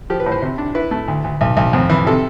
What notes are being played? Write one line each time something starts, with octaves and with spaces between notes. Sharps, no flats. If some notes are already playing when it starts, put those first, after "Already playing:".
F3 G4
B4
A2
C5
C3
D4
E4 B4
A3
D2
D2
B1
B1
F2
E3
C3 A4